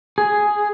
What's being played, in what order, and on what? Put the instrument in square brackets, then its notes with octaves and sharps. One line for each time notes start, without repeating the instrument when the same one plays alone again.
[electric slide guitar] G#4